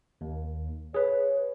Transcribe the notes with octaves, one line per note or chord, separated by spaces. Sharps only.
D#2
G#4 B4 C#5